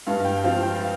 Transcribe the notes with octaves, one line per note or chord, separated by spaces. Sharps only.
G2 F5
F5
G5
G5
F3 C4 F5
G5
F5